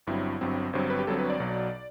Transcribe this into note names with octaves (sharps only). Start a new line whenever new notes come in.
G1 G2 F#3 C4 E4
G1 G2 F#3 C4
G1 G2 F#3 C4 C5
B4
G4
G1 G2 F#3 C4 A4
B4
D5
B1 B2 F#3